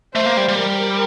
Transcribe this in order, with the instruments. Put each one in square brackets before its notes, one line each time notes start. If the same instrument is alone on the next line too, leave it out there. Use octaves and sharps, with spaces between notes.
[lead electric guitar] A3 [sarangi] C5
[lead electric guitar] A#3
G3
G3
[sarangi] A#4